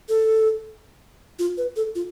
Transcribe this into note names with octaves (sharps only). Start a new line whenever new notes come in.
A4
F4
B4
A4
F4